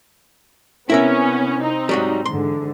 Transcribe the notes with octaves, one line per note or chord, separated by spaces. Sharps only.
C3 B3 C#4 E4 A#4 E5
C4 D#4
G#2 F#3 G3
G#2 D3 E3 C6